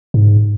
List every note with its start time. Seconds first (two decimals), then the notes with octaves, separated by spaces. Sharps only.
0.14 G#2